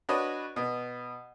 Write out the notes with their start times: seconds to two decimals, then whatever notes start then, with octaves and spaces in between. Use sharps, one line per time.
0.09 D4 F#4 B4 C#5 D#5
0.56 B2